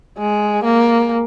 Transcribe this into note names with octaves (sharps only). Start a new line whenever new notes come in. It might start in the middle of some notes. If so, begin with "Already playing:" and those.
G#3
A#3